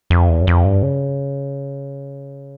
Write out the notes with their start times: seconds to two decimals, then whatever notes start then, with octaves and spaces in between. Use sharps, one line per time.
0.10 F2
0.29 E2
0.42 F#2
0.47 F2
0.65 G2
0.83 C#3